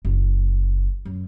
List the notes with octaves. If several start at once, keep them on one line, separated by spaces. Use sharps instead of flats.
F#1
F#2